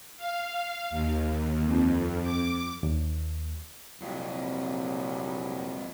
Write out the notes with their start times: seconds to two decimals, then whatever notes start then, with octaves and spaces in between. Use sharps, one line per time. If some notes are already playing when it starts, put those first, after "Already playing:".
0.17 F5
0.91 D#2
1.65 F2
2.23 D6
2.83 D#2
4.01 C2 F2 A#2 F#3